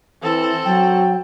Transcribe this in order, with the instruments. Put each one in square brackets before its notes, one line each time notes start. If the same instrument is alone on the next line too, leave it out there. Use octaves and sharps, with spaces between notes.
[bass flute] E3 [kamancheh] C4 A4
[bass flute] F#3 [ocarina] G5